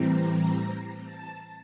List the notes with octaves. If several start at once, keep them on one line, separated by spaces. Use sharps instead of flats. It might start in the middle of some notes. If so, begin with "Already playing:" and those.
Already playing: A2 E3 G3 C4 A#5
A5